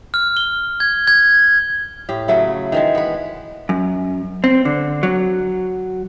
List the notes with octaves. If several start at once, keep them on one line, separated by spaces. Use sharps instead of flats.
F6
G7
G#6
G#6
A2 G4
C#3 F#3 A3 E4
D#3 E3 G#3
B3 B4
F#2
C4
D3
F#3